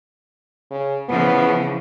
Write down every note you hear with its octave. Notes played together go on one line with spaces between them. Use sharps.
C#3
C#3 E3 F3 B3